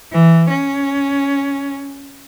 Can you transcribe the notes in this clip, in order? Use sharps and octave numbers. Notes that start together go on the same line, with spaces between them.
E3
C#4